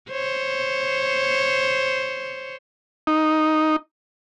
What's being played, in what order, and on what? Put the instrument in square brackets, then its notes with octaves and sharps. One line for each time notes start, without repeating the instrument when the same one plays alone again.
[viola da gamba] C5 C#5
[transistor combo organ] D#4